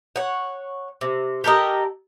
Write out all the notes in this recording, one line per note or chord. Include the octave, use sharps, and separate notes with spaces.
C#5 F#5
C3
G4 A4 A#4 D#5